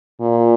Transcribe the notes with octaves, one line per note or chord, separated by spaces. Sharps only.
A#2